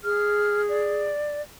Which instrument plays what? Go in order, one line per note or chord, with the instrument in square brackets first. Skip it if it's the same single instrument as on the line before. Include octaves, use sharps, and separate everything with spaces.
[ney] G#4 [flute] F6
[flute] D5